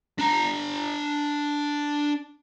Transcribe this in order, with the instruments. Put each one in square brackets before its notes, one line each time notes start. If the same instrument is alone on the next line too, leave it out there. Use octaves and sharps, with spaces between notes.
[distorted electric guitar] D4 A#5